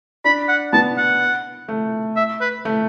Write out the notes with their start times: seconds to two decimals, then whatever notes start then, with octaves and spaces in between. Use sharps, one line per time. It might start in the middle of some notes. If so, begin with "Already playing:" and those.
0.24 D4 B5
0.48 F#5
0.73 B3 A5
0.97 F#5
1.68 A3
2.16 E5
2.41 B4
2.65 A3